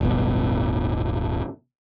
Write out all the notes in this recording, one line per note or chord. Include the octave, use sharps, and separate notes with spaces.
D1 G1 B2